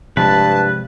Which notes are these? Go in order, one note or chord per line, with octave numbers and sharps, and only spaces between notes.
G2 C3 F3 G#3 B4 A5